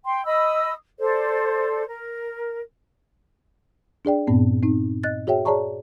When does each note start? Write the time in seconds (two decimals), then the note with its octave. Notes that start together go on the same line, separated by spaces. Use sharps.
0.04 G5 C6
0.25 D#5 B5 D#6 E6
0.99 A4 C5 D5
1.87 A#4
4.05 D4 G#4 D5 G5
4.27 G2 A#2 B3 C4
4.63 C4 D#4
5.03 D#5 F#6 A6
5.27 F#4 G#4 C#5 E5 G5
5.45 G#4 C#5 D5 A5 A#5 C#6